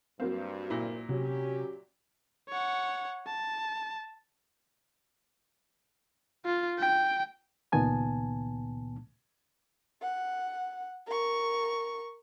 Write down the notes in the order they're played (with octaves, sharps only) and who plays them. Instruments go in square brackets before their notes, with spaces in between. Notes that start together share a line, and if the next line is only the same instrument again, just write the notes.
[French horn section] G2 [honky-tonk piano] F#3 A#3 C4
[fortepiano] A#2 E4
[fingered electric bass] C3 [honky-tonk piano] F#3 [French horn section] C#4 G4
[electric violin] C#5 F#5
A5
F4
G5
[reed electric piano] C#2 A#2 D#3 B3 G#5 A5
[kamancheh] F#5
A#4 C#6